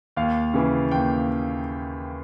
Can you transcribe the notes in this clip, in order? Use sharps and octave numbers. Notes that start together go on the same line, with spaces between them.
D#2 F5
C#3 E3
D#2 G5